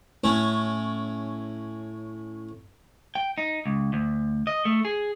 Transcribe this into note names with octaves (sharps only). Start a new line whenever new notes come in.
A2 C#4
G5
D#4
C#2
D2
D#5
A3
G#4